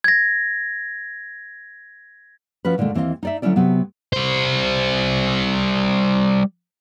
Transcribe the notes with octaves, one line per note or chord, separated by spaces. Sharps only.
G#6 A#6
F3 C#4 F#4 B4
A#2 D3 D#3 G#3 A3
D#2 E3 C4 G#4 D#5 F5
D#4 D5 E5
D3 F#3 G#3 C#4 E4 D5
C3 F#3 B3
G3 C5